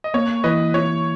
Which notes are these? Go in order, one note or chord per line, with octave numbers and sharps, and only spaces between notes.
D#5
A#3 C#5
E3 B4 D#5
E4 C#5